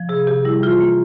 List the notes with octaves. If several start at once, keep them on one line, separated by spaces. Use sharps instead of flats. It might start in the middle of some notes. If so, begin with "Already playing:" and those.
Already playing: F3
C3 G#4
C3 G4
G3 E4
E3 F4
A#3